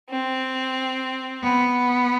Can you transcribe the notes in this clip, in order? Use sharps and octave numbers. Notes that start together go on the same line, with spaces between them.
C4
B3